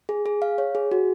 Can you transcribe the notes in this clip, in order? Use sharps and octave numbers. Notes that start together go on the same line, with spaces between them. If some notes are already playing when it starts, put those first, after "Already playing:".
G#4
G#4
F5
C#5
G#4
F#4